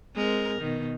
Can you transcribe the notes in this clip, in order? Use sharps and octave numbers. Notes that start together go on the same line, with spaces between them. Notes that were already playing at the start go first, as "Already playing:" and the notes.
G#3 C4 A#4
B2 D#3